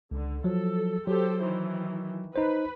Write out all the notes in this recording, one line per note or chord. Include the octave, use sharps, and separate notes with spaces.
C#2 D3
F3 F#3 A4
F#3 G4 A4 C5
D#3 E3
D#4 B4 C5